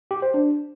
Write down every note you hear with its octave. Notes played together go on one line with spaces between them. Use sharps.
G4
C5
D4